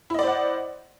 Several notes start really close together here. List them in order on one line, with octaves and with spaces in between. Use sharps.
E4 D#5 D5 C5 F#5